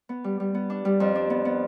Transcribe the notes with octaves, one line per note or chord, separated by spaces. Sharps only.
B3
G3
G3
B3
D4
G3
F2
D4
B3
B3